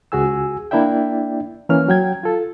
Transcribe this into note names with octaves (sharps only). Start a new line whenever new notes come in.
C#2 F#4 G#4 G#5 E6
A#3 D4 E4 D5 E5 G5
E3 A#3 C#4 F6
F#3 G5 G#6
F4 A4